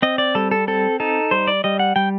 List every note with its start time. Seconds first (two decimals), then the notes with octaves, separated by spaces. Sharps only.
0.02 C4 D#5
0.18 D5
0.35 G3 A4
0.51 A4
0.67 C4 A4
1.00 D#4 A4
1.31 G3 C5
1.48 D5
1.64 G3 D#5
1.79 F#5
1.96 G3 G5